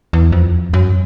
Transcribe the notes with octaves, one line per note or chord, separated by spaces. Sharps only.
E2
F2
F#2